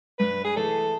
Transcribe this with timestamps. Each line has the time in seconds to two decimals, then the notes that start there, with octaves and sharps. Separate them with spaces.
0.19 G2 B4
0.44 G#4
0.56 E3 A3 A4